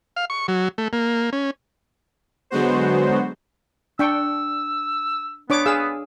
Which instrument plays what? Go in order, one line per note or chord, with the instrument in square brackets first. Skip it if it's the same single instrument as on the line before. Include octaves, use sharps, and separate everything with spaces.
[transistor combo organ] F5
C#6
F#3
A3
A#3
C#4
[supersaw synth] D3 F#3 G#3 B3 F#4 C5
[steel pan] D4 G5 C#6 [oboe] E6
[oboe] B3 [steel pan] D4 C#5 D6
[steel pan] G#4 F5 E6